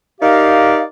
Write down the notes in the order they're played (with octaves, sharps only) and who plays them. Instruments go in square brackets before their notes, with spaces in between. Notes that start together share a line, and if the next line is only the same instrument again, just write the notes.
[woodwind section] D#4 G4 A#4 D5 F5